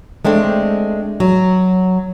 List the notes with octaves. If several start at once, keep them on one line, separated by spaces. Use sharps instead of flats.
G#3 A3 C4 D4
F#3